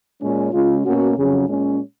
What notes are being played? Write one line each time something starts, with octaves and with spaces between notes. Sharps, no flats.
A#2 G#3 C#4
C#3 G#3 C#4 F4
B2 A#3 C#4 F#4
F2 C#3 F#3 C#4 G#4
A#2 G#3 C#4